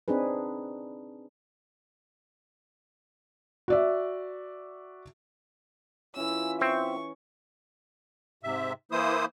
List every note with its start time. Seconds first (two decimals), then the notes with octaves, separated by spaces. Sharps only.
0.08 C4 D4 D#4 G#4 B4
3.68 F#4 D5 E5
6.16 E3 C#4 E4 F4 E5 E6
6.61 C4 C#6
8.43 G#2 C3 E5
8.92 E3 A#3 E4 C5 D#6